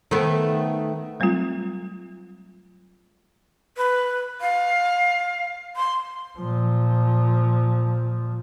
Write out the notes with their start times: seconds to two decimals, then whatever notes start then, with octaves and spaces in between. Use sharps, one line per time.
0.11 D#3 A3 B3
1.20 F#3 G3 A3 C4 F4
3.77 B4
4.41 F5
5.76 C6
6.39 A#2 F3